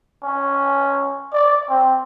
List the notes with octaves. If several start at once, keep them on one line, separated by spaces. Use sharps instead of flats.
C#4
D5
C4